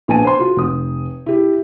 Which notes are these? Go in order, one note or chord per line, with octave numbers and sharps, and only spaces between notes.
A#1 B3 G#5 A5 D#7
C5 C6
F4 F#4
F1 D#6
E4 G4